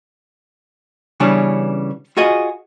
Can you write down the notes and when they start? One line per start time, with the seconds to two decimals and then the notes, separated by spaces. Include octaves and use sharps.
1.20 C#3 E3 G3 B3 C#4 D4
2.17 F4 F#4 G#4 D#5